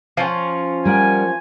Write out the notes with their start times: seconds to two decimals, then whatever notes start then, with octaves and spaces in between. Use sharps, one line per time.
0.17 F3 C#4
0.85 G3 A#4 F#5 G#5